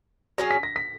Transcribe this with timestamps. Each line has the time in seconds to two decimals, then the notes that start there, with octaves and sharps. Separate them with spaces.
0.38 F#3 C#4 G#4 A#6
0.51 B6
0.63 A#6
0.76 B6